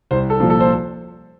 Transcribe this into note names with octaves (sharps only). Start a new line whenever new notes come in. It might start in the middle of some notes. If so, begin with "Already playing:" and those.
C2 C5
A4
A#2 F3
A4
C5